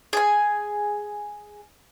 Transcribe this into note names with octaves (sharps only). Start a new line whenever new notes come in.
G#4 G#5